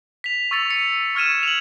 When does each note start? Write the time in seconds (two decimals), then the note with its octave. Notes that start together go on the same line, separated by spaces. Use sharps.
0.24 B6 F7
0.51 C#6 E6 A6 C#7 F7
0.70 C#7
1.15 C#6 F6 G#6 D#7 E7
1.43 F7 F#7